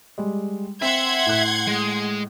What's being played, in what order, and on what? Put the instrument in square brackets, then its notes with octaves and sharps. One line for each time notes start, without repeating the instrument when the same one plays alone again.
[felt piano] G3 G#3
[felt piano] C4 [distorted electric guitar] E5 [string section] F#5 C6 G#6
[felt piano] A2 F#6
[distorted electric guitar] G#3